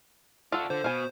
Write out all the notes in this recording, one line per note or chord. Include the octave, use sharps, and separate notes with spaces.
D4 F4 F#4 A4
D3 C5
B2 F5 G#5